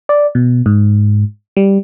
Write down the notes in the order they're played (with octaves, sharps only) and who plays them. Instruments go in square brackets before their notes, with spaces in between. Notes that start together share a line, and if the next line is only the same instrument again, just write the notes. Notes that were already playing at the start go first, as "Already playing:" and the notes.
[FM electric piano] D5
B2
G#2
G3